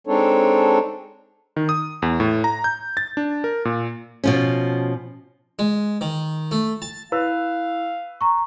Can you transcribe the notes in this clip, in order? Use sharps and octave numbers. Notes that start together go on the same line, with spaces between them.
G#3 C4 D4 D#4 A4 C#5
D#3
D#6
E2
A2
A#5
G6
A6
D4
A#4
A#2
B2 F3 C#4
G#3
D#3
A3
A5
E4 B4 F5 E6
A#5 C#6